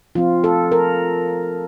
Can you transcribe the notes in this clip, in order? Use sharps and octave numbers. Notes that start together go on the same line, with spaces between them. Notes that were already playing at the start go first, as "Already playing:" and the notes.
F3 C4 F4
A4
A#4